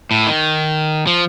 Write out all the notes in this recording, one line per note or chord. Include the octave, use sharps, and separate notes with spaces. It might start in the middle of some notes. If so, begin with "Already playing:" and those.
A2
D#3
F3